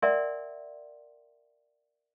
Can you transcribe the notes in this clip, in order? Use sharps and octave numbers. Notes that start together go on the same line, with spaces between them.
A#4 D5 E5 F#5 G#5 C6